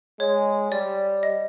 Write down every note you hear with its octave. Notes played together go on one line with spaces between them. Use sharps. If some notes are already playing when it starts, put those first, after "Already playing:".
G#3 C#5
G3 D5
D#5